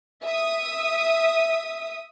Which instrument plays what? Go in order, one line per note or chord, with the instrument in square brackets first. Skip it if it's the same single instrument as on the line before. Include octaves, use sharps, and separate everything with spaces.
[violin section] E5 D#6